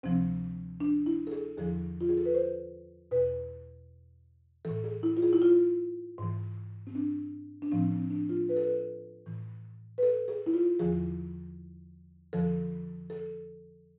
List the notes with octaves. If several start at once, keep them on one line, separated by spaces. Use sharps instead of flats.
D2 C3 F3 C4
D4
E4
A4
G#4
E2 D3 F3 G#4
F4
G#4
A4
B4
C5
E2 B2 B4
A2 E3 A4
G#4
E4
F4
G#4
E4
F4
G#2 E3
C4
D4
D4
A2 F3 C4
C4
D4
F4
B4
A4
B4
A2 E3
B4
A4
G#4
E4
F4
E2 D3 F3 G#4
F2 D3 F3 A4
A4